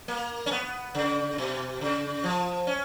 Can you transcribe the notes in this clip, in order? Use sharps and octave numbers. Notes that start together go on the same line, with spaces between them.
A#3
C#4
B3
C#3
B2
C#3
F3
C#4